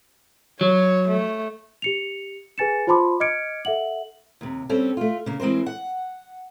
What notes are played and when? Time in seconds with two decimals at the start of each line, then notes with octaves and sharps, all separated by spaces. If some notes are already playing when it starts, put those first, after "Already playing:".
0.61 F#3 C#5
1.08 A3
1.82 G4 C#7 F7
2.58 G#4 B4 G#5 A6 C#7 E7
2.87 F4 C5 A5 B5 C6 D6
3.20 D#5 D6 F6 G#6 C#7 D7
3.65 A4 E5 F#5 F#7
4.41 D#2 C3
4.69 G3 C4 C#4 A4
4.97 A3 F4
5.26 C#3 A#3
5.40 E3 G#3 C4 A#4 C5
5.66 F#5